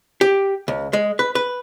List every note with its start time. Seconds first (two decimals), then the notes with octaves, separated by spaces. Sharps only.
0.21 G4
0.68 C#2
0.93 G#3
1.19 B4
1.35 B4